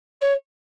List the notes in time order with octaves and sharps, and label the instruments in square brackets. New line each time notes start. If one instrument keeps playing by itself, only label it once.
[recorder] C#5